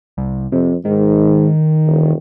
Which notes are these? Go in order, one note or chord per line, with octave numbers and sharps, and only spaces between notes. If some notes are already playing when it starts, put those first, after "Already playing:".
C2
F2 C3
G#2 D#3
E1